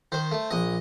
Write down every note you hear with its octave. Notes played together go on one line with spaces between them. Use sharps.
D#3 C5
A3
A#1 D#5